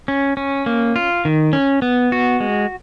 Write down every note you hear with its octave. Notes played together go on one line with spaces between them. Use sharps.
C#4
C#4
A#3
F4
D#3
C#4
B3
F#4
G#3